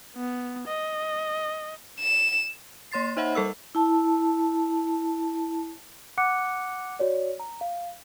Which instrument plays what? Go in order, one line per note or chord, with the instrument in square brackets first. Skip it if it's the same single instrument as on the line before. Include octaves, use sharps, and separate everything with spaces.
[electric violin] B3
D#5
[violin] E7
[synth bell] A#3 C#5 C6 A6 C7
D#4 C5 D#5 E5 F#5 B5
G3 A4 A#4 E6
[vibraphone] E4 A5
[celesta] F#5 D6 F#6 C#7
F#4 C#5 D5
A#5
F5